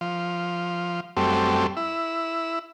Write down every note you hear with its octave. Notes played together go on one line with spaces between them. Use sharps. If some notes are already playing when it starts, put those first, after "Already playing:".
F3
F#2 G3 A3 C4
E4